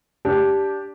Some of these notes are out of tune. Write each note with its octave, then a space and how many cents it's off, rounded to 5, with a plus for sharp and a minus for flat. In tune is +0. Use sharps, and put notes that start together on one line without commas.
D4 -10 G4 +0